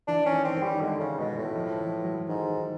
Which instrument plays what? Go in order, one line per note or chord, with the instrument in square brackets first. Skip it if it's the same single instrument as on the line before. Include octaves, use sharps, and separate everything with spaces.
[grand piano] E3 [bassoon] D4
[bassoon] C#4
[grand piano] D#3
[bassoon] C4
[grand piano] D#3
[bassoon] G3
[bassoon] D3 [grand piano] G#3
[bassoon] C#3
[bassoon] B2 [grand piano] G#3
[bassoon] A2
[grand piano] F3
E3
F#3
[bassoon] G#2 [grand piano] D#3